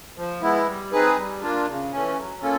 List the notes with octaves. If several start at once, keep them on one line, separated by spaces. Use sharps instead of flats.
F3
G#3 B3 E4
G3
C4 D#4 G#4 B4
G3
A#3 D4 F4
C#3
E3 A3 C#4
F#3
A#3 C#4 F4 A4